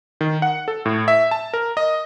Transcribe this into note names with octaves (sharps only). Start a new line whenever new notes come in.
D#3
F#5
A4
A2
E5
A5
A#4
D#5